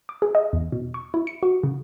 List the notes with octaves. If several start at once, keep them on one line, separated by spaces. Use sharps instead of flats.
D6
G#4
D#5
E2
B2
C#6
E4
C#7
F#4
C#3